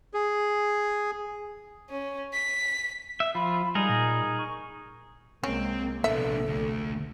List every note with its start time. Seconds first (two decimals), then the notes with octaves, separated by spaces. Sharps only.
0.14 G#4
1.90 C#4
2.33 B6
3.20 E5
3.35 F3 F4 B5
3.75 G3 D#4 G#4 A#4
3.89 A#2
4.39 C#6
5.43 C2 G#3 A#3 C4 C#4
6.04 A#1 C3 B3 D4 A4 E5
6.47 D2 A3